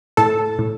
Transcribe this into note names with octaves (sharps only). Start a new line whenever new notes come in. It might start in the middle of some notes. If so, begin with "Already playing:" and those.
A2 A4 A5
A2